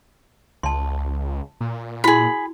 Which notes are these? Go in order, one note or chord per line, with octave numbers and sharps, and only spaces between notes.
C#2 A5 C6
A#2
E4 F#4 G#4 B5